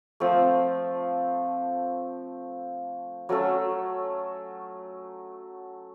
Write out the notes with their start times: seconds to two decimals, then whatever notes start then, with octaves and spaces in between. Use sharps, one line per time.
0.20 F3 A3 C4
3.29 F#3 A3 C#4 A4